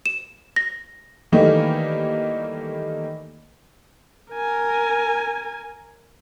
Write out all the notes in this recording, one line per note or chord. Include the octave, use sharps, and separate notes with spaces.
E7
A#6
D#3 E3 G3 A3 A#3 D#4
A#4 G#5